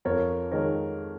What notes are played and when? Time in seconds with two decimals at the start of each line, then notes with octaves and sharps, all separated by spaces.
0.05 F2 A#4 C#5
0.51 D#3 G#3 A#4 C#5